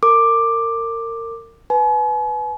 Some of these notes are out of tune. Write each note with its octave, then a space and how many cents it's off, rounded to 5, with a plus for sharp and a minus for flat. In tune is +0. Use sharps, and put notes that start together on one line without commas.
A#4 -30 D6 +10
B4 +5 G#5 +45